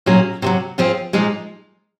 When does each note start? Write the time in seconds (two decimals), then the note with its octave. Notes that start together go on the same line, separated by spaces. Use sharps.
0.06 A#2 F#3 C#4 G#4
0.42 C3 D#3 F#3
0.78 F3 C4 F4 G#4
1.13 A#2 F3 G#3 D#4 G#4